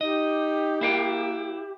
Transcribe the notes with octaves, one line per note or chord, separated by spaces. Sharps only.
D#4 G4 D#5
A#3 E4 F5 G5